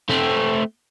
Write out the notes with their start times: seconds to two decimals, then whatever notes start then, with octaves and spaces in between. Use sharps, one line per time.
0.10 A3 C4